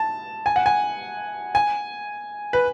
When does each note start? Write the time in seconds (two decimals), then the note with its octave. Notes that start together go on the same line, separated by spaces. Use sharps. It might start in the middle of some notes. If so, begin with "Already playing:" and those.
Already playing: A5
0.46 G#5
0.56 F#5
0.66 G#5
1.55 G#5
2.53 B4